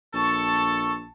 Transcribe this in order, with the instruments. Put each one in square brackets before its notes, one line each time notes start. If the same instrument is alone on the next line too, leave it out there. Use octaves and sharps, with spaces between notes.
[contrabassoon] A#1 [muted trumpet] A4 [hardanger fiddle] A5 [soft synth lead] C#6